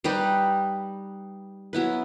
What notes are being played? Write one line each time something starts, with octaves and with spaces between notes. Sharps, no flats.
G3 D#4 G4 B4
F#3 B3 E4 B4